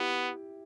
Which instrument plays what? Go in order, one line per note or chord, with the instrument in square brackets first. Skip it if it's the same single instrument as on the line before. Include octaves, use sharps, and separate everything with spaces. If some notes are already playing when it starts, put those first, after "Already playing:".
Already playing: [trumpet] B3 [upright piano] E4 G4